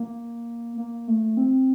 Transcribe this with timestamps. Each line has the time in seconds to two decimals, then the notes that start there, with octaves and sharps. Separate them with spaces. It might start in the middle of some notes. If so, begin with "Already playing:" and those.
Already playing: A#3
0.77 A#3
1.08 A3
1.37 C4